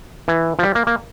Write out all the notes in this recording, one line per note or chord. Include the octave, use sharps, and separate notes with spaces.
E3
F3
G3
A#3
A#3